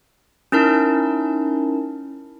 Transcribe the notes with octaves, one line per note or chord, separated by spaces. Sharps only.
C#4 D#4 E4 A#4 A5